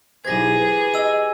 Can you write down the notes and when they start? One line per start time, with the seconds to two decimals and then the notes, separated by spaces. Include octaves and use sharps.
0.25 B1 E3 F#3 G3 G#4 C5 G#6 A#6
0.60 B4
0.94 G4 D#5 G#5 E6 D#7